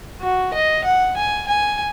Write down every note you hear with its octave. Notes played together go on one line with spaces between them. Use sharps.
F#4
D#5
F#5
G#5
G#5